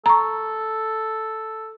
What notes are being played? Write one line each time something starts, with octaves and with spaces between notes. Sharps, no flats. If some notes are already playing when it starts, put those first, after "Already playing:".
A4 A#5 C#6